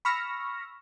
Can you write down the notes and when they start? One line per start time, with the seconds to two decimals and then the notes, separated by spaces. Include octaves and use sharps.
0.05 B5 C#6 E6 F6 A#6